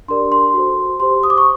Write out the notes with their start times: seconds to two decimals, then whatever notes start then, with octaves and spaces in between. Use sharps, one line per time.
0.08 D4 G4 A#4 D5 C6
0.32 C6
0.54 F#4 A4 C5
1.00 G4 C5 C6
1.23 D#6
1.30 D6
1.37 C#6